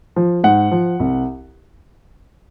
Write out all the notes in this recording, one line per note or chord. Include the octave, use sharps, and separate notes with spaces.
F3
G#2 F#5
F3
C2